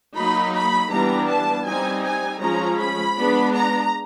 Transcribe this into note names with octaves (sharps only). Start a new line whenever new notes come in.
F#3 A#3 D#4 B5
B5
E3 G3 B3 D4 A#5
A5
G3 C4 D#4 G#5
G#5
F3 G#3 C#4 A#5
B5
G#3 B3 D4
A#5